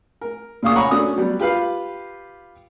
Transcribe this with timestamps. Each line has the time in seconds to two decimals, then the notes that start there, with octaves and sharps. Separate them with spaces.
0.21 A#4
0.63 A#2 C#3 F5 C#6 D#6
0.76 C#5 F#5 G#5 A#5 B5 C#6
0.91 A3 C#4 D4 F#4 D#6
1.16 F#3 G3 B3
1.40 F4 G4 B4 F5